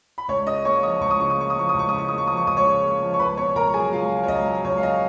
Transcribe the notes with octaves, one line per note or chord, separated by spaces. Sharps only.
B5
C#2 C#5 C#6
C#3 D#5 D#6
A#3 C#5 C#6
F3 D#5 D#6
C#2 C#6
D#6
C#3 C#6
D#6
A#3 C#6
D#6
F3 C#6
D#6
C#2
C#6
C#3 D#6
C#6
A#3 D#6
C#6
F3 D#6
C#6
C#2 D#6
C#5 C#6
C#3
A#3
F3
C#6
C#2 B4 B5
B2 C#5 C#6
C#2 A#4 A#5
F#3 G#4 G#5
C#2 F4 F5
B2
C#5
C#2 D#5
F#3
C#2 C#5
F5
B2 D#5